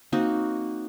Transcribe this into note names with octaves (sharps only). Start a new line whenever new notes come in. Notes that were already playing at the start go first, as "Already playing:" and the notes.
A#3 C4 D#4 F#4